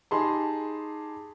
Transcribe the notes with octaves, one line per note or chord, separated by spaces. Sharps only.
D#4 G4 G#4 A5 B5 C6